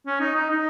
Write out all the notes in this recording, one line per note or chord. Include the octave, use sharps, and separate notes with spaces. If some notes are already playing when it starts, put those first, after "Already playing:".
C#4
D#4
D#4
D#4